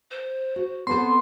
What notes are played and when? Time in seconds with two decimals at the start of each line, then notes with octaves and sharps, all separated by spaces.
0.11 C5
0.56 F#4
0.87 B3 C4 A4 C5 C6